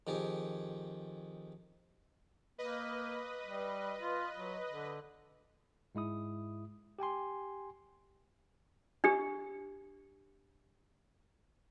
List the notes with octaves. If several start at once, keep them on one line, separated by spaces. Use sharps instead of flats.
F2 D#3 G4 G#4
A#3 B4 D#5
G3
F4
F#3
D3
G#2 G#3 E4 D#6
G4 G5 G#5 C6
D4 G4